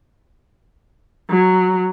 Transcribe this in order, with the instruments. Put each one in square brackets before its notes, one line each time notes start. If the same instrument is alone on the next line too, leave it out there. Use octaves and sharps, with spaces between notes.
[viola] F#3